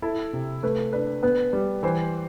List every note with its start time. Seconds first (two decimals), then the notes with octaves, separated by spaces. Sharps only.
0.02 E4 A4
0.33 C3
0.63 A3 B4
0.93 D4 B4
1.23 B3 B4
1.53 G3
1.83 E3 C5